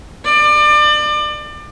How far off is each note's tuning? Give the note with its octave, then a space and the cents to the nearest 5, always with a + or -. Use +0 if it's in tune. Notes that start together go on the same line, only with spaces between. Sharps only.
D5 +30